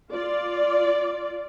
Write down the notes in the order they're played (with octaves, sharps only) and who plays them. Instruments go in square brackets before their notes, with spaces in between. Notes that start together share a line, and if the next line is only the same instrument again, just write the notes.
[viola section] F4 D5